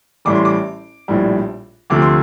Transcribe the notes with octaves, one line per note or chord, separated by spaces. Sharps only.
A1 A2 G3 D6
C6
D6
A#1 A2 G3
D2 C3 F3 A3 D6
C6